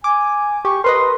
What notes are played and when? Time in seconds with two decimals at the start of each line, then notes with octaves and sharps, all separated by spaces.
0.04 G#5 D6
0.65 G4 C#6
0.84 A#4 B4 D#5 C6